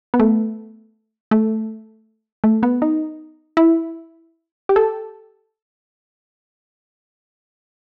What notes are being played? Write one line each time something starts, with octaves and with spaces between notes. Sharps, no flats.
B3
A3
A3
A3
B3
D#4
E4
G4
A4